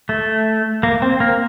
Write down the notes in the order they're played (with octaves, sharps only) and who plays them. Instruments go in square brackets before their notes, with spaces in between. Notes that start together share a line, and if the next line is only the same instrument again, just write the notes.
[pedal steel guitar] A3
A#3
C4
A#3